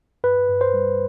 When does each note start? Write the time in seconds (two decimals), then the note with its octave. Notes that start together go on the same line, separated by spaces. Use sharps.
0.24 G2 B4
0.49 G2
0.61 C5
0.74 G3